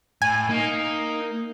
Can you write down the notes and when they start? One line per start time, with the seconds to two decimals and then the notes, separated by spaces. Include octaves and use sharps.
0.22 A2 G#5
0.50 A#3 D#4